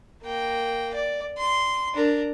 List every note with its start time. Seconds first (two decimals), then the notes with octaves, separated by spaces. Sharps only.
0.23 A#3 G5
0.94 D5
1.38 C6
1.95 D4 A#4